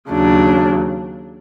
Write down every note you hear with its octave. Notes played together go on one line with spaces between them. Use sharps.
D#2 C#3 F#3 D4